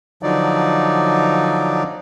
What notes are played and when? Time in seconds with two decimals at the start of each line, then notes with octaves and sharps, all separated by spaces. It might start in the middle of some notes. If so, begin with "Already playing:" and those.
0.23 D3 F3 F#3 D#4 D5